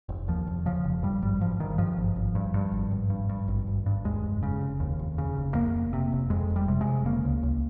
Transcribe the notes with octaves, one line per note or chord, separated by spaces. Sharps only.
F1
D#2 F3
F1
C#3 F3
F1
G2 G3
G#1 G3
G#1 F3
G2 D#3
G2 F3
G#1
G#1
G2
G2
G#1
G#1
G2
G2
G#1
G#1
G2
D#2 G#3
F1
C#3
F1
D#2
F1
C#3
F1
F2 A#3
F1
C3
F1
F2 G#3
F1
G3
C3
G#3
F1
C#3 A#3
C#2
C#2